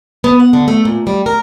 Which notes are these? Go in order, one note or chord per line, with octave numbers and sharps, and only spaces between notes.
B3
F#5
D3
A3
A#2
G3
A#4